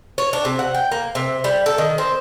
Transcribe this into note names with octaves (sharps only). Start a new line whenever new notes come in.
C#5
D4
C3
F#5
G5
A#3
C3
G3
A4
D#3
C4